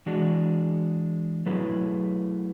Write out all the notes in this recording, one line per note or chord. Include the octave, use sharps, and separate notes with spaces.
E3 G#3 D4 F#4
F#3 A3 E4 G#4 B4